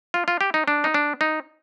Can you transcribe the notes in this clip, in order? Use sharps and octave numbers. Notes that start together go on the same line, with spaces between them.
F4
F4
G4
D#4
D4
D#4
D4
D#4